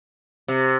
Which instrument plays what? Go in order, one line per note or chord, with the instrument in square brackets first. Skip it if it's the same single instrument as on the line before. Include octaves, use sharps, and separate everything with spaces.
[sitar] C3